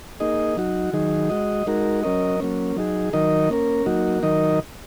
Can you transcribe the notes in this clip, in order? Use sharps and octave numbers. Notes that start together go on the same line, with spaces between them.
A#3 D#4 G#4 D#5
F#3 D#4 F#4
D#3 F#3 D#4 G#4
G#3 F#4 D#5
G#3 D#4 F#4 A#4
F#3 C#4 A#4 D#5
F#3 A#3 C#4
F#3 D#4 G#4
D#3 F#3 D#4 A#4 D#5
A#3 C#4 A#4
F#3 A#3 D#4 F#4
D#3 F#3 D#4 A#4 D#5